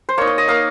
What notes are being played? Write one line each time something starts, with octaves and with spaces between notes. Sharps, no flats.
C5
A#3 D#4 C#5
D#5
D#5
A#3 D#4 F5